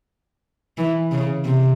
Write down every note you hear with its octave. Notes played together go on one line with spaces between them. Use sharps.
E3
C#3
C3